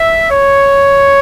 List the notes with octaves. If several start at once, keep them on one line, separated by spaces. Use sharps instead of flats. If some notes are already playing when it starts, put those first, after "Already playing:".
Already playing: E5
C#5